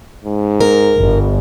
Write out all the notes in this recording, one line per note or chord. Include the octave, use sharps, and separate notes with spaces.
G#2
A#4
G1